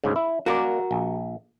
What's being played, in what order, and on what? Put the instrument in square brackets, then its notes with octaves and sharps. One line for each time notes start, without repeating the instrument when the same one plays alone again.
[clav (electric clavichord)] D2 G#2 C#3
E4
[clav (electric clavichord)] A#3 D5 [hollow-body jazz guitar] F#4 A#4
[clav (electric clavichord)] A#1